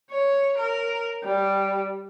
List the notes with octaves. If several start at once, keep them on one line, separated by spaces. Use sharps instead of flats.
C#5
A#4
G3